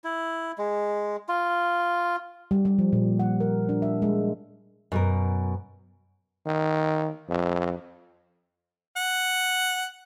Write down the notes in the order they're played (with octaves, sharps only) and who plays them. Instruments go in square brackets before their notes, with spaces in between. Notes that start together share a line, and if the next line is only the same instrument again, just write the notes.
[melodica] E4
G#3
F4
[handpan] G3
G3
F3
A#2
F#5
A#4
D4
E5
G#3
[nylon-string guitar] F#2 B2 A#4
[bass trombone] D#3
F2
[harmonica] F#5